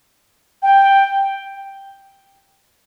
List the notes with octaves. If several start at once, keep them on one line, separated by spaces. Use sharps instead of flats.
G5